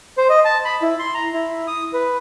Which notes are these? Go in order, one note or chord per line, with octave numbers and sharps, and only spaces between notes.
C5
D#5
A5
B5
E4
C6
A#5
E4
D#6
B4